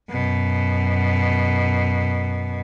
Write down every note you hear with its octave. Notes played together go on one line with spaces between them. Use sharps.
F#2 B2